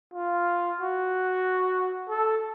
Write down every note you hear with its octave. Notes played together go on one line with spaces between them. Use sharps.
F4
F#4
A4